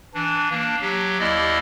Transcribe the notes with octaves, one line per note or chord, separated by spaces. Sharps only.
E3 D4
A#3 D4
F#3 G4
D#2 E4 D5 D#5